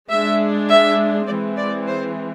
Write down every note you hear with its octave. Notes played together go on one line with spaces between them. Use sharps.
G#3 D4 E5
E5
E3 G#3 C4 D5
D5
C5